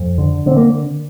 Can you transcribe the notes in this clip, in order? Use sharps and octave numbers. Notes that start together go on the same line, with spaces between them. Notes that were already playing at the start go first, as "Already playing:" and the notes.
Already playing: F2
D3
D3 C4
A#3